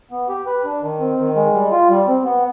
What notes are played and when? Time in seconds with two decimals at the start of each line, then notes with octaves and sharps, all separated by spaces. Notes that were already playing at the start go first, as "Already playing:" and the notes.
0.11 B3
0.29 G4
0.46 B4
0.64 D4
0.82 D#3
0.99 C4
1.18 D#3
1.35 G#3
1.53 G3
1.72 F4
1.89 G3
2.07 C4
2.24 B3